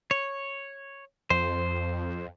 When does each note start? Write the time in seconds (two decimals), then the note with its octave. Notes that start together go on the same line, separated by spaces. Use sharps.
0.11 C#5
1.30 F2 C5